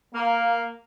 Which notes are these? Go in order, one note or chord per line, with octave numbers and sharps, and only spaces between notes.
A#3